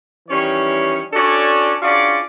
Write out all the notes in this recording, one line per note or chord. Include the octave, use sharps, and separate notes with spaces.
D#3 E3 G3 C#4 C#5
C#4 D4 F#4 A4 C#5 D5
C#4 D4 F4 F#4 G#4 D5